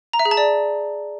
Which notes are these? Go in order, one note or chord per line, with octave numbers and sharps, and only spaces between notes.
A#5
E5
G#4
A5
D5